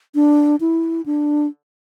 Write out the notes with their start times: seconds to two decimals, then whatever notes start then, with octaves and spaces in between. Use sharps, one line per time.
0.15 D4
0.60 E4
1.06 D4